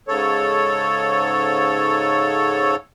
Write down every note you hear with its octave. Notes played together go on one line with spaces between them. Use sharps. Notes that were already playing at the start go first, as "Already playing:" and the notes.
G#2 C#3 A4 C#5